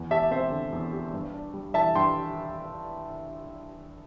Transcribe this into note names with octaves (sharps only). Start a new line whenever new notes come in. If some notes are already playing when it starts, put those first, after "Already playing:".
Already playing: E2
G4 E5 A5
C4 C5 E5
D3
E2
G4
G2
D4
G3
E3 E5 A5
G2 G5 C6